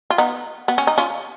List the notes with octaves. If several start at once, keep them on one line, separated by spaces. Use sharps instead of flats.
F4
B3 D#4
B3
C#4
D#4
C#4 F4